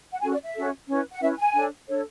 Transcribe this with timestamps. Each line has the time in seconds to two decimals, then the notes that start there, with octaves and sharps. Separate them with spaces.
0.13 F#5
0.21 C#4 F#4 A4 G#5
0.32 D5
0.44 E5
0.55 C#4 F#4 A4
0.88 C#4 E4 B4
1.11 F#5
1.21 C#4 E4 B4 E5
1.38 G#5
1.55 D4 A4 C#5
1.88 D4 A4 C#5